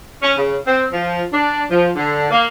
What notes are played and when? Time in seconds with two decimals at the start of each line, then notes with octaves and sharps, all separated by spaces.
0.22 C#4
0.37 C#3
0.66 C4
0.92 F3
1.32 D4
1.70 F3
1.96 D3
2.31 A#3